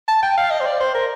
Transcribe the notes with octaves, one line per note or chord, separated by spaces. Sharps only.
A5
G5
F5
D#5
C5
D5
C5
A#4